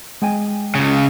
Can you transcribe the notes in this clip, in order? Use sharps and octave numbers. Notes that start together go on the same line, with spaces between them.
G#3 G5 G#5
C#2 C#3